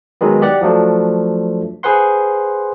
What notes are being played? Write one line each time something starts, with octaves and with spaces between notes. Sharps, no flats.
D#3 F#3 G#3 B3
G4 D5 F#5
F3 F#3 A3 D4
G#4 B4 C5 F#5 C6